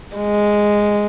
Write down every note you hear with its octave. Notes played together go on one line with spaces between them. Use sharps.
G#3